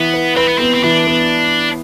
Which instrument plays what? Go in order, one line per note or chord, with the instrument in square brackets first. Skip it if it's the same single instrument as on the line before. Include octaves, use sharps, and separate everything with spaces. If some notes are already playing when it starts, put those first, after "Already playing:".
Already playing: [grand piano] E3 [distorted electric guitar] B3
[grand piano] B4
[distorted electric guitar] C4 [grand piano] B4
[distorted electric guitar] B3
[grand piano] B3 [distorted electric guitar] C4
[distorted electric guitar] C4
[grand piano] E3 [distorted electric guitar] D4
[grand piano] B3